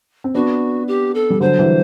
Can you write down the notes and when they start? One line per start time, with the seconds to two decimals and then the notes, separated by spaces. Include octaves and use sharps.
0.24 C4
0.35 B3 D4 F#4
0.87 G4
1.15 A4
1.30 G3
1.40 D3 F#3 C5
1.59 E3 G3